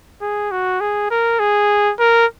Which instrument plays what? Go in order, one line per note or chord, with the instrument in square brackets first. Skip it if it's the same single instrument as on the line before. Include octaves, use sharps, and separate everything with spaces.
[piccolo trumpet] G#4
F#4
G#4
A#4
G#4
A#4